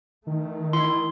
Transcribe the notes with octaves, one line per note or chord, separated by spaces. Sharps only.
D#3 E3 A3
E4 C6